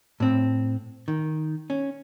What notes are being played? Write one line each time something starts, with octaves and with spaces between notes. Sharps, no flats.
A2 C4
D#3
C#4